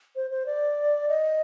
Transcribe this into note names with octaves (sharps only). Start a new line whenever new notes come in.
C5
C5
D5
D#5